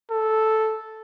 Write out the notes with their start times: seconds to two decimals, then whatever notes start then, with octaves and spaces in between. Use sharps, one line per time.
0.11 A4